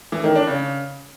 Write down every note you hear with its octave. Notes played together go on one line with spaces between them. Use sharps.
E3
D#3
D4
C#3